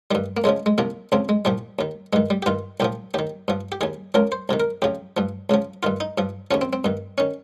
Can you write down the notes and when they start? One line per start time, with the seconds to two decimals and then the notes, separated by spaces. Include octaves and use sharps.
0.11 G2 D#3 G3
0.37 A#3
0.44 C#2 C#3 F3 G#3
0.66 G#3
0.78 C2 C3 F3 A#3
1.12 C#2 C#3 F3 C4
1.29 G#3
1.45 C2 A#2 F3 G3
1.79 D#2 D#3
2.13 G2 D#3 G#3
2.30 G3
2.42 G4
2.46 G2 D#3 F4
2.80 C2 A#2 F3 G4
3.14 D#2 D#3 G4
3.48 G2 F3
3.72 G4
3.81 D#2 D#3 G#4
4.14 C#2 C#3 F3 A#4
4.32 C5
4.49 C2 C3 D#3
4.60 A#4
4.82 F2 C#3 F3 G4
5.17 G2 F3
5.50 C#2 C#3 F3
5.83 G2 D#3 F4
6.00 D#4
6.18 G2 F3
6.51 D#2 C#3 F3 C#4
6.61 C4
6.73 C4
6.84 G2 D#3
7.18 D#3 C#4